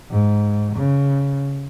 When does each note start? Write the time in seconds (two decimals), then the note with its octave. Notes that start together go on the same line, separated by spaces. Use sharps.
0.11 G#2
0.75 C#3